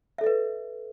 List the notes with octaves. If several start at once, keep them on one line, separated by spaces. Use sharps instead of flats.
A4 B4 D#5 E5